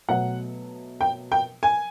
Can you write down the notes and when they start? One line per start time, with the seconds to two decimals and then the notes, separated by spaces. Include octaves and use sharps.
0.09 B2 F#3 A3 F#5
1.01 G5
1.32 G5
1.63 G#5